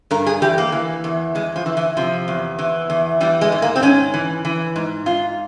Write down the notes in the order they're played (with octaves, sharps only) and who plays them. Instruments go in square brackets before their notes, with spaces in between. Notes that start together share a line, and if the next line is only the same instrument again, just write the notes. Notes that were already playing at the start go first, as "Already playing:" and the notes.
[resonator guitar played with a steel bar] G2 A#4
G#4
E3 G4
A#3
E3
E2
E2 G#3
F3
E3
E3
C3 F3
E2
E3
E2
E3 G3
G#3
G#2
A#3
C4
G#2 C#4
E3
E3
G#2
G#2 F4